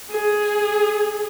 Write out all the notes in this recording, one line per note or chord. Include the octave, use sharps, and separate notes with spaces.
G#4